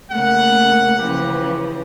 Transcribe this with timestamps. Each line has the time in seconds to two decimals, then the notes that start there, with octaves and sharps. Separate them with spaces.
0.11 C#3 A3 A#3 F#5
0.99 C#3 E3 F3 G4